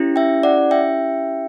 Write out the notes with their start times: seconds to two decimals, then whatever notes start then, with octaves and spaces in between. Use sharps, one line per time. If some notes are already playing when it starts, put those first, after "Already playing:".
Already playing: C#4 E4 G4
0.16 E5 G5
0.43 D5 F#5
0.71 E5 G5